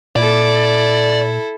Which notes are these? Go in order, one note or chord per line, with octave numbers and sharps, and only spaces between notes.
A#2 E4 A4 D5